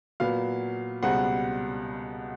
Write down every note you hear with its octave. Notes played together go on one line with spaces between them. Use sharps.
A#2 F#3 B3 F5
C#2 B2 G3 C4 F#5